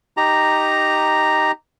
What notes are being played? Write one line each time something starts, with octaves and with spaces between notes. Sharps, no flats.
D#4 G4 A#5